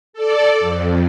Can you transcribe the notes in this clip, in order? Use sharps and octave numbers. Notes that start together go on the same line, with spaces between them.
A4 D5
F2